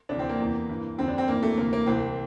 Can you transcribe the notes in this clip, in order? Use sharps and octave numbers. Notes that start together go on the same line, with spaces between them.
D2 C3 E3 D4
C4
A#3
E2 C3 E3
G2 E3
F2 D3 C4
D4
C4
G2 E3 A#3
A3
D2 C3 E3 A#3
A#3
C2 C3 E3 C4